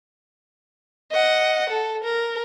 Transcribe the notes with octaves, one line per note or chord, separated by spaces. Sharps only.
D#5 F#5
A4
A#4